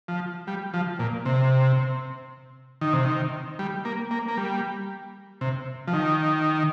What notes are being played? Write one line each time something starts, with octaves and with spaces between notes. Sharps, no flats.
F3
G3
F3
A#2
C3
D#3
C3
D#3
G3
A#3
A#3
A#3
G3
C3
F3
D#3